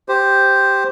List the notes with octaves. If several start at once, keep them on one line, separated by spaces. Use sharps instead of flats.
G4 C5